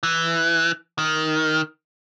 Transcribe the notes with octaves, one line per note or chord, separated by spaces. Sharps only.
E3
D#3